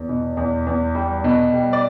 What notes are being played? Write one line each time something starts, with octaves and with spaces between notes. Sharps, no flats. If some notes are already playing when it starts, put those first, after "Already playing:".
Already playing: E2
B2
E2
E2
G3
B2
G3
D5